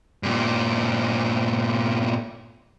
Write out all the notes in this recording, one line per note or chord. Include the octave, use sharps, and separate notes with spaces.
G2 A#2